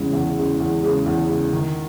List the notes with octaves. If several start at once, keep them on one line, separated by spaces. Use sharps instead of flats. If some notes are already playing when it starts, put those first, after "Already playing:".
Already playing: E2 C#3 G#3
E2
C#3 G#3
E2
C#3 G#3
E2
C#3 G#3
D#3